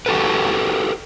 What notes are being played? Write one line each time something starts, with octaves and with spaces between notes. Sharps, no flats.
F#4 G4 A4 B4